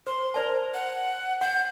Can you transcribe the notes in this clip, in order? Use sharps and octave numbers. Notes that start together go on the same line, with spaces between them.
C5 C6
A#4 C5 D5 A5
F#5
F#5 G6